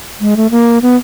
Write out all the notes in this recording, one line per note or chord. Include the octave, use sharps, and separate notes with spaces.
G#3
A3
A#3
B3